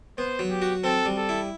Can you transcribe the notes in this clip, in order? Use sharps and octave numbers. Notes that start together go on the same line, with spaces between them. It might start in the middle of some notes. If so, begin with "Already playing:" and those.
B3 C5
F#3
G4
F#4
C4 A4
G3
A4
E4